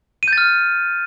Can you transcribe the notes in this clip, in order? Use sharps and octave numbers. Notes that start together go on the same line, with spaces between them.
F6 G6 A6 D#7